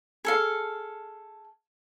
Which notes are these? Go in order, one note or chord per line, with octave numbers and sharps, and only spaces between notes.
G#4 A4 F5